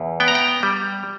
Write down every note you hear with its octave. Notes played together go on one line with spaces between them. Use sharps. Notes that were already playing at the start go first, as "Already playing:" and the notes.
Already playing: E2
B3 G5
A#5
G5
G3